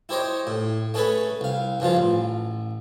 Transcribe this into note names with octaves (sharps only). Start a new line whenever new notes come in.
E4 G4 C5 C#5 D#5
A2
A3 C#4 G#4 A4 B4 B5
C2 F5
G2 C#3 F3 F4
A1